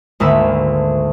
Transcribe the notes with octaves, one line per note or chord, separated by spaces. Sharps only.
G#1 D2 A#3 B5 E6